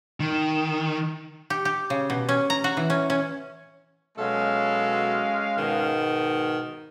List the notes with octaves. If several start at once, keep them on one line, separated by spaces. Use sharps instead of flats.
D#3
G4
G4
C#3
B2
C#4
A#5
F#4
E3
C#4
C#4
B2 F#3 G#3 C#4 A4 F5
G#2 B2 D#3